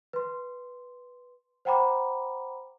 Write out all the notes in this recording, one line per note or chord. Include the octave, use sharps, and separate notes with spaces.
B4 C6
C5 F#5 G5 A#5 B5 D6